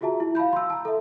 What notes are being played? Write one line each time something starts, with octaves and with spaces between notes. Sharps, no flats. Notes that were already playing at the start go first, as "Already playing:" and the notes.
F4 F#4 G#4 E5 A5 A#5
E4
F5 A5 B5 G6
C6 E6
A5 A#5
A4 E5